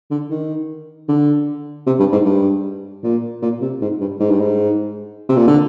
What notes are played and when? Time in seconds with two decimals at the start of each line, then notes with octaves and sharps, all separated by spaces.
0.11 D3
0.30 D#3
1.09 D3
1.86 C3
1.99 G2
2.12 G#2
2.25 G2
3.04 A#2
3.42 A#2
3.61 C3
3.81 G#2
4.00 G2
4.20 G#2
4.30 G2
4.40 G#2
5.29 C3
5.37 A#2
5.47 D3